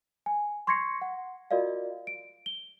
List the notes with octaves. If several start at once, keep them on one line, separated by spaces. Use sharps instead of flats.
G#5
C6 C#6 G#6 A#6 C7 C#7
F#5
F4 F#4 A#4 D5 D#5 F5
D7
G7